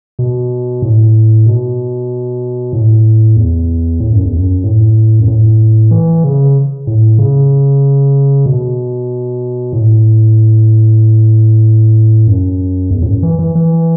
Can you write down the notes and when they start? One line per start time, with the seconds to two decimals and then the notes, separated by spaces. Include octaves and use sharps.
0.19 B2
0.82 A2
1.46 B2
2.73 A2
3.36 E2
4.00 A2
4.13 F#2
4.25 E2
4.36 F#2
4.64 A2
5.20 F#2
5.28 A2
5.91 E3
6.24 C#3
6.87 A2
7.19 C#3
8.46 B2
9.73 A2
12.27 F#2
12.91 E2
13.02 A2
13.06 F#2
13.23 E3
13.39 E3
13.55 E3